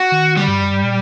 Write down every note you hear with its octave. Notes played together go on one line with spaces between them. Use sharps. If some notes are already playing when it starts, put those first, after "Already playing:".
Already playing: F#4
D#3
D3 G3
G2
F#2
G2
A#2